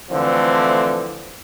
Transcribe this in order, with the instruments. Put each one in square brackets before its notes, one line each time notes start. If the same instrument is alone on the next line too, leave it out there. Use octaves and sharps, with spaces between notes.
[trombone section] D3 E3 F3 A3 C4